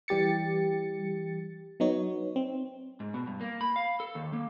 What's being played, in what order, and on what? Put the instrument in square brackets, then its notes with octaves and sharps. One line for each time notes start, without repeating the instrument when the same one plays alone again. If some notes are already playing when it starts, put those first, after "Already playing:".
[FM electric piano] E3 G3 G4 A6 C#7
F#3 B3 D#4 C#5
C4
[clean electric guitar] G#2
B2
G2
A#3
B5
F5
A4
D#2
A#3